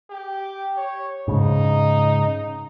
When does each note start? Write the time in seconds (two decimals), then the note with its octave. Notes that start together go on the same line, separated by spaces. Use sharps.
0.11 G4
0.77 C#5
1.28 G#2 C#3 D#4